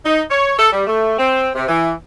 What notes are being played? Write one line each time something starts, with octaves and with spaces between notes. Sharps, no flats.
D#4
C#5
A4
G3
A3
C4
C3
E3